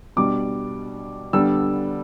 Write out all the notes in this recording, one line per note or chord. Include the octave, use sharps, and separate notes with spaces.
B2 G3 D4 D6
D3 G3 B3 D4 E6